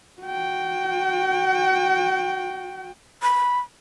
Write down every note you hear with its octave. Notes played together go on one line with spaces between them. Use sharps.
F#4 G5
B5